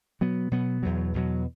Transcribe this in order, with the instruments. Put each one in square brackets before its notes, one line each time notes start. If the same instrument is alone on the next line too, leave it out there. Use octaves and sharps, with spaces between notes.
[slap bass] B2 F#3 B3
B2 F#3 B3
E2 B2 F#3
E2 B2 F#3